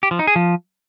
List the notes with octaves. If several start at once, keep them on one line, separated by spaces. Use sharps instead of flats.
G4
F3
D#4
G#4
F3